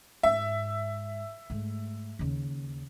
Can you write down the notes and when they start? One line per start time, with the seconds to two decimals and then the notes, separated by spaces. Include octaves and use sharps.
0.23 G#2 E5
1.50 G#2 A3
2.19 D#2 C#3